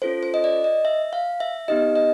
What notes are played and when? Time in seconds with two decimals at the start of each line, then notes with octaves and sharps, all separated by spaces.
0.02 C#4 F4 A4 C5
0.23 C5
0.34 D#5
0.44 D5
0.64 D#5
0.85 E5
1.13 F5
1.40 E5
1.68 B3 D#4 G4 D#5
1.96 D#5